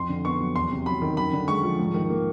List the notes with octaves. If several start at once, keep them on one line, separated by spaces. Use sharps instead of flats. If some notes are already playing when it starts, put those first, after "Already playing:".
Already playing: F2 C6
D3
B3 C#6
F#3
E2 C6
C3
F#3 B5
D#3
F#2 B5
D3
G#3 C#6
F3
G#2
D#3
A#3